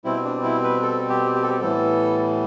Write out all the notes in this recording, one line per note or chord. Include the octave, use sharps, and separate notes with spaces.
B2 G3 C4 E4
D4
E4
B4
A4
G4
G4
A4
G4
A2 E3 G3 B3 A4